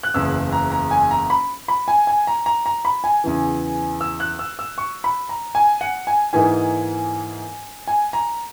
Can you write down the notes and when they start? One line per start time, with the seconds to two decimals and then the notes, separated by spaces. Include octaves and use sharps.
0.03 F#6
0.14 F#1 E2 C#3 E6
0.52 A#5
0.72 A#5
0.91 G#5
1.11 A#5
1.30 B5
1.68 B5
1.88 G#5
2.07 G#5
2.27 A#5
2.46 A#5
2.66 A#5
2.85 B5
3.04 G#5
3.24 E2 C#3 E3
4.01 E6
4.20 F#6
4.39 E6
4.59 E6
4.78 C#6
5.04 B5
5.29 A#5
5.55 G#5
5.81 F#5
6.07 G#5
6.33 G#2 E3 A#3 D#4 G#5
7.88 G#5
8.13 A#5